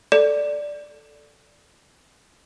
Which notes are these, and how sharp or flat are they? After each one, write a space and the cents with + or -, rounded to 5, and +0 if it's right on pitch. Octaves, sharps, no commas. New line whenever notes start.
A4 +0 D5 +0